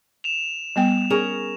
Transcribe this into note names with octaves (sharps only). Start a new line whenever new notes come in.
E7 F7
G3 B3 G5
C#4 G#4 A#4 F7